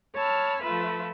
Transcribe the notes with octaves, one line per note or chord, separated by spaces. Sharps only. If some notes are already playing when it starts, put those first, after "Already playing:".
C#5 A5 B5 E6 F6
F3 A3 F4 B4 E5